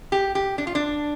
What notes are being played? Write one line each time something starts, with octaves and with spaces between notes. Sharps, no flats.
G4
G4
D4
F4
D4